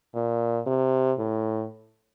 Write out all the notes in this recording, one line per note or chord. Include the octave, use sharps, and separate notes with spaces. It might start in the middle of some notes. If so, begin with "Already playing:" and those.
A#2
C3
A2